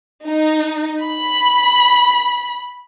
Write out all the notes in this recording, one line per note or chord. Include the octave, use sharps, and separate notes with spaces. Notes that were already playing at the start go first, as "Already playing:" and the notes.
D#4
B5